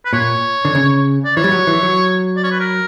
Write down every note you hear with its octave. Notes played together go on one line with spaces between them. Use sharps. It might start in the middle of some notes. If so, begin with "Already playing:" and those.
B4
A#2 C#5
D3
C#3
D5
E3 C#5
G3
F#3
E3
F#3
D5
C#5
B4
A#4